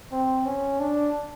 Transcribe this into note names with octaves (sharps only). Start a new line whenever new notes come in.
C4
C#4
D4